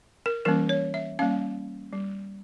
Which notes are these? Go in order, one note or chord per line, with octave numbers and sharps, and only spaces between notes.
A#4
E3 G3 A#3 C#4 A#4
C#5
E5
G3 A#3 C#4 F5
G3